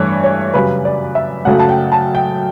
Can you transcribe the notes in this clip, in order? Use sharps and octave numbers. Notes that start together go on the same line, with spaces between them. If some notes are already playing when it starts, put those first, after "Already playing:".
Already playing: G2 E3 A3 D4 C#5
C#5
F#2 C#3 G3 B4
D5
E5
F#2 C#3 F#3 A3 F#5
A5
G5
A5
G5